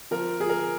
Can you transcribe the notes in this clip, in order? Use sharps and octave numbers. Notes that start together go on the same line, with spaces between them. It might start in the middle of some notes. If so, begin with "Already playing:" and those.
F3 A#4
F3 G#4
A#4